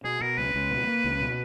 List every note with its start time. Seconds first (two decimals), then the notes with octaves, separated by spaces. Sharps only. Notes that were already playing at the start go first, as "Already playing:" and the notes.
0.04 B2 G#4
0.21 B2 A#4
0.38 C#2 B4
0.54 C#2
0.71 B2
0.87 A#3
1.04 C#2
1.21 B2